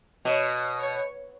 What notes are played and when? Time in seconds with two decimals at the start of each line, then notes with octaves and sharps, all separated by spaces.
0.25 B2 C#5
0.79 C#5